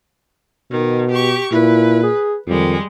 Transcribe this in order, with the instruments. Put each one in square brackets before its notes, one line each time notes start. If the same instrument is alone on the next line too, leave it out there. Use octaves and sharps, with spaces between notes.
[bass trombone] B2 [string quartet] D#3
[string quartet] G4 C#6
[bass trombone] A#2 [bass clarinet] E4 [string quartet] B4
[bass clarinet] G#4
[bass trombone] F2 [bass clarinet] D#3 [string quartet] G3 G#3